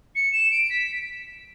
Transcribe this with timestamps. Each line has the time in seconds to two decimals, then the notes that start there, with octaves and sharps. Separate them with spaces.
0.15 C#7
0.33 E7
0.51 D7
0.70 B6